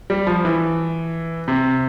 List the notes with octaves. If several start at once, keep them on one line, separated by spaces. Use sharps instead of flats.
G3
F3
E3
C3